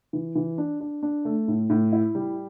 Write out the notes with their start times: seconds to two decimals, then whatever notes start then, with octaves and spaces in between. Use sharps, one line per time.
0.13 E3
0.35 E3
0.58 D4
0.81 D4
1.03 D4
1.25 A3
1.48 A2
1.70 A2
1.93 E4
2.15 G3